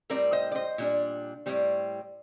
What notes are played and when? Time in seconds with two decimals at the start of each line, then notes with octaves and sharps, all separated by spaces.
0.10 A2 G3 C4 A#4 D5
0.32 C5 D#5
0.52 D5
0.55 C5 D#5
0.78 A#2 G3 D4
1.46 A2 G3 C4